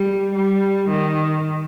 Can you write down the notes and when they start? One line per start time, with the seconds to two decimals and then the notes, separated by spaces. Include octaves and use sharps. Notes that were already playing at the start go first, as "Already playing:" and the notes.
Already playing: G3
0.35 G3
0.90 D#3